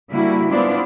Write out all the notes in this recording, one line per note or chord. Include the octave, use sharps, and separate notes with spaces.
D3 G3 A#3 E4 F#4
G#3 B3 C4 D4 E4 F4